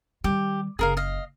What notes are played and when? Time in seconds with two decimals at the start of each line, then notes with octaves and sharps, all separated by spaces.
0.24 D#3 G3 G4
0.79 F#1 C#3 G#4 A#4 F5
0.97 D#5 F5